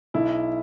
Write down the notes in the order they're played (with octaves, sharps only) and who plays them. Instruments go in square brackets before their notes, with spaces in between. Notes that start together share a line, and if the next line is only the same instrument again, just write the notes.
[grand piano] B1 E4